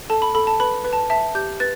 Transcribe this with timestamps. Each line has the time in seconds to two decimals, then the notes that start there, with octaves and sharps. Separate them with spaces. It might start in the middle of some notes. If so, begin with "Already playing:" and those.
0.10 A4 A5
0.22 B5
0.35 A4 B5
0.47 A5
0.60 B4 B5
0.85 B4
0.93 A5
1.10 E5 A5
1.35 G4 G6
1.60 B4 A6